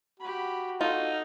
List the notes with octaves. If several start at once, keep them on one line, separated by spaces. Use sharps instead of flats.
F#4 G4 B5
D#4 F4 A4